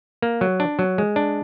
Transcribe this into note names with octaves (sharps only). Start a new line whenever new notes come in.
A#3
F#3
D4
F#3
G#3
D4